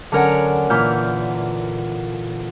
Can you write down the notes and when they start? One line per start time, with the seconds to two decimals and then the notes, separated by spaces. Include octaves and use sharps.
0.12 D3 F#3 C#4 A#4 C#5 F#5
0.70 A#2 D3 E3 F6 G6